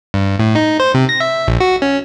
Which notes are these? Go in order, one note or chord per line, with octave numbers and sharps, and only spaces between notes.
G2
A2
D#4
C5
C3
A#6
E5
A#1
F#4
C#4